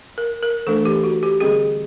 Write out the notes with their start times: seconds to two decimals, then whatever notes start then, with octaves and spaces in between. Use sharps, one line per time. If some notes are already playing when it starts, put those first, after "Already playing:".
0.18 A#4
0.43 A#4
0.67 E3 A3 D4 A4
0.85 G4
1.04 F#4
1.23 G4
1.40 D3 G3 C4 G#4